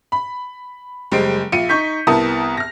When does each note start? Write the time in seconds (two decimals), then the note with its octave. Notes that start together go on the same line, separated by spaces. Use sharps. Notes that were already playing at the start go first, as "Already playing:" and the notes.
0.12 B5
1.12 F#1 G3 G#3 C5 D7
1.52 A#1 F4 C#7 D#7
1.69 D#4 C#6 G6 B6
2.07 C2 B3 E4 A#4 A5 D#6
2.57 F6 A#6